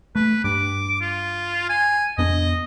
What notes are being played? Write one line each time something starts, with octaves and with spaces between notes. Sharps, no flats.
A3 B4
G2 D6
F4
G#5
F2 B3 D4 D#5